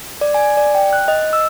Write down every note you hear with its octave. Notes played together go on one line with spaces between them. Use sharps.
D5
G#5
D5
G5
F#6
D#5
E6